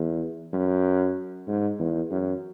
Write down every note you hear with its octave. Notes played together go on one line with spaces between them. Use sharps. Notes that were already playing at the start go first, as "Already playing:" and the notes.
Already playing: E2
F#2
G#2
E2
F#2